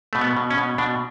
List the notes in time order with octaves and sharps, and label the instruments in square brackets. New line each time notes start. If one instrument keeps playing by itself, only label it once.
[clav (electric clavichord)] B2 A3
B3
B2
C#4
B2
B2 D4